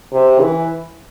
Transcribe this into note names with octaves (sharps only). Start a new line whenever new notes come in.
C3
E3